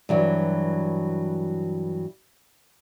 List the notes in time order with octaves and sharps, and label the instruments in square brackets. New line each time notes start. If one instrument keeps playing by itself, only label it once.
[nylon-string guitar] G2 E3 F#3